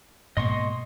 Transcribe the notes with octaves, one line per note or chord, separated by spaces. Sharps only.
G#2 B2 A#3 D#5 C6 C#6